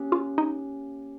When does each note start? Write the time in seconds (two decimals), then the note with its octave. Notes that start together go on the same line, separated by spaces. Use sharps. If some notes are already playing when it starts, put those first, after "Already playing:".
Already playing: A#3 C#4 G4
0.12 F4
0.38 D#4